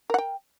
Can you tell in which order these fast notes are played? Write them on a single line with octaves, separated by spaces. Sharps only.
A#4 F#5 G5